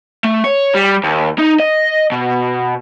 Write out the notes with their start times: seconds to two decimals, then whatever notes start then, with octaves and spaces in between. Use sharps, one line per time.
0.24 A3
0.44 C#5
0.75 G3
1.04 D#2
1.39 D#4
1.60 D#5
2.12 B2